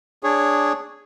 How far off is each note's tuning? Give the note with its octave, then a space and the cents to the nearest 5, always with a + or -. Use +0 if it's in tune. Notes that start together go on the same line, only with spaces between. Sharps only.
D4 +0 G#4 -10 C#5 +0